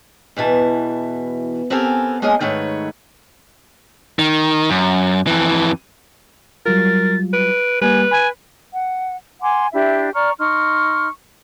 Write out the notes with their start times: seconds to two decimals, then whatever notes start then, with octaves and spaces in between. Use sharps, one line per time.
0.37 E2 B2 E3 A5
1.70 B3 C4 G4 A4 A#4 G#5
2.22 G#3 A#3 C#4 G#4 D#5
2.40 G#2 D#3 A3 B4 C#5
4.19 D#3
4.70 F#2
5.27 F2 E3
6.66 F#3 G3 F4 A#4 A6
7.33 B4 D7
7.82 G3 A#3 B4 G#5
8.11 G#5 B5
8.73 F#5
9.41 F#5 G#5 C6 D6
9.73 D4 E4 G4 E5
10.14 D5 A#5 C#6 F6
10.39 D#4 C6 C#6 F6